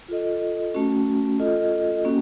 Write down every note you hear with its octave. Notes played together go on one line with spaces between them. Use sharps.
F4 A4 D#5
A3 C#4 F#4
F4 A4 D#5
A#3 C#4 F#4